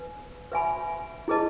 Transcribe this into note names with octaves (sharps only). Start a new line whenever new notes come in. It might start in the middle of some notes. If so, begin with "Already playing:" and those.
Already playing: B4 G#5
B4 E5 G#5 B5
E4 G#4 B4 D#5 A5